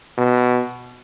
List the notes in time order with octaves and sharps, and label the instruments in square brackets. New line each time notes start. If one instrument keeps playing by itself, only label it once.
[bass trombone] B2